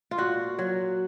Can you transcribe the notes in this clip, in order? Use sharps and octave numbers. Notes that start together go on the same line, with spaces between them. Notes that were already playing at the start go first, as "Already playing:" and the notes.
F4
A#2 F#4
F#3